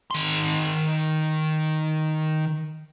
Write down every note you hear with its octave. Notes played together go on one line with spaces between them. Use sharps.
D#3 C6